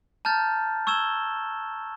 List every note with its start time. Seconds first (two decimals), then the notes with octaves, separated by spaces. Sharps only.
0.25 A5 A#5 F6 G6 A6
0.87 C#6 E6 G#6 E7 G7